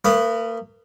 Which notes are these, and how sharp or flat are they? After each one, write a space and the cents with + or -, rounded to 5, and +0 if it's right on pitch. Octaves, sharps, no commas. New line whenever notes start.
A#3 -40 B4 +0 D#6 -15